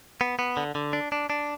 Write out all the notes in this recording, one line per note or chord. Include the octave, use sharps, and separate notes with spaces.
B3
B3
D3
D3
D4
D4
D4